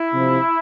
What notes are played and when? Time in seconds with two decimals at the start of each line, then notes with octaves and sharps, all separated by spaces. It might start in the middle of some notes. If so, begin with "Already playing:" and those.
Already playing: E4
0.13 C3 F3